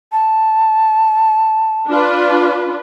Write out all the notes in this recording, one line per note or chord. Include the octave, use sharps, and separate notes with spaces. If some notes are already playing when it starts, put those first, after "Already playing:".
A5
D4 F4 B4